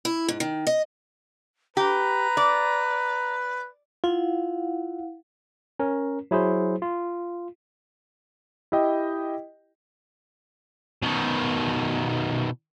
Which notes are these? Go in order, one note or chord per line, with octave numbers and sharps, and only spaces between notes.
E4
G#2
D#3
D#5
G4 B4 A#5
D5
E4 F4 F5 F#5
C#4 A#4
F#3 E4 G#4 C5
F4
E4 G4 D#5 G5
B2 D#3